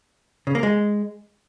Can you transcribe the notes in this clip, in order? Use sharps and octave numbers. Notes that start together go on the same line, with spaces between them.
C#3
A#3
G#3